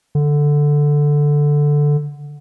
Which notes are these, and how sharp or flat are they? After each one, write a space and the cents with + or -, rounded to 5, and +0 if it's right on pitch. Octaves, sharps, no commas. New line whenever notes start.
D3 +0